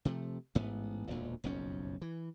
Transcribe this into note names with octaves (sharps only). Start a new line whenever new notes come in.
C3 F3 A3
A1 G#2 B3
E1 D2 A#2
F#1 B1 F2 C#4
E3